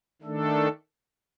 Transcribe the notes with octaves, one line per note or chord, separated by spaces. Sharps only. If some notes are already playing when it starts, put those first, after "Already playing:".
D#3 A3 D4 A4